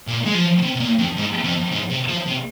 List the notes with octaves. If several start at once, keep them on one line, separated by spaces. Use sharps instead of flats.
A#2
G#3
F3
C3
C3
A#2
F2
G#2
F2
G#2
C3
F3
C3